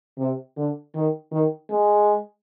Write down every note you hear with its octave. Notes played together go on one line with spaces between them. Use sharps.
C3
D3
D#3
D#3
G#3